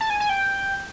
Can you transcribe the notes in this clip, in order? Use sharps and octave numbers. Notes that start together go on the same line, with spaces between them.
A5
G#5
G#5
G5